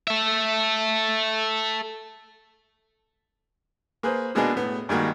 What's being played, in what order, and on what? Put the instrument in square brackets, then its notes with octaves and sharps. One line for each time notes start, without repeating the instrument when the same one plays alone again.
[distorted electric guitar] A4 E5
[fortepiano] A#3 G#4 B4 C5
B2 G#3 A#3 B3 D4 G#4
A2 B3
G2 D#3 G#3 A#3 F#4